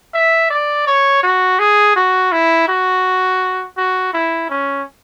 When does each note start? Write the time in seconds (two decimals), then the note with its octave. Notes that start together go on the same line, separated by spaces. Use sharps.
0.13 E5
0.50 D5
0.87 C#5
1.23 F#4
1.59 G#4
1.96 F#4
2.32 E4
2.68 F#4
3.77 F#4
4.13 E4
4.49 C#4